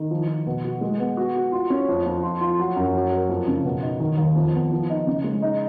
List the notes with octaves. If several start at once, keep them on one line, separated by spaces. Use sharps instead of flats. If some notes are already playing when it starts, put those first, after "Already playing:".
Already playing: D#3
F3
F3
B2
F#4
G#3
B3
F#4
F#4
F4
C#4
F2
F2
F4
F4
F#3
F#2
F#3
A#4
F2
C#3
B2
D#4
D#3
D#2
F2
B3
F3
D#4
C#3
G#3
D#4